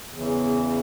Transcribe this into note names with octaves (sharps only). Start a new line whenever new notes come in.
E2 C#3 E3